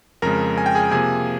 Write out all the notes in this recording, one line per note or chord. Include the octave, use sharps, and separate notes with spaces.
F2 C#3 G#3 A#4 A#5
G#5
G5
G#4 G#5
C3 F3 A#3 G#4 G#5